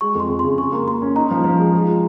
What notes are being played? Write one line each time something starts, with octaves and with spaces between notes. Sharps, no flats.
G#3 C#6
F2 C6
F2
C#3 C6
G#4 C#6
A#3
A#3 C6
C#4
D#4 A#5
F3
F3
G#3
F4
G#3